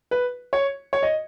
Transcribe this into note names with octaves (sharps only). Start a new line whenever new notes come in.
B4
C#5
C#5
D#5